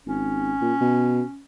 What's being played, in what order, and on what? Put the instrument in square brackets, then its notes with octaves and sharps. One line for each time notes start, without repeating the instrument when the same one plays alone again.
[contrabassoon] G#1 [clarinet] C#4
[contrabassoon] A#2
B2